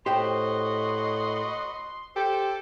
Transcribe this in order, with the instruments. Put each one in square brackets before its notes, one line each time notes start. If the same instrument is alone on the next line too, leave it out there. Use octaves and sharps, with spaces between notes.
[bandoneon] A2 [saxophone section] F#4 B4 D#5 [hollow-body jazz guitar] G4 C5 G5 [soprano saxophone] C6
[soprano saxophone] G4 [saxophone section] A4 [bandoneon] C5